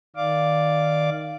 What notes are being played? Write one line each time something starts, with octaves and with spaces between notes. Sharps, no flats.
D#3 D5 F5 D6